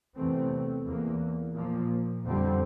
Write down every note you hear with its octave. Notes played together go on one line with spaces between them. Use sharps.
E2 C3 E3 A3 C4
E2 E3 A#3
A#2 F3 A#3
F2 D3 G3 C4